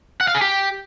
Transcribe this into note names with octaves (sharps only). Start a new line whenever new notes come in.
F#5
F5
G#4
G4